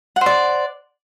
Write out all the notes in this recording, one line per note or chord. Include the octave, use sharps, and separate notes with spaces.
C5 D5 F#5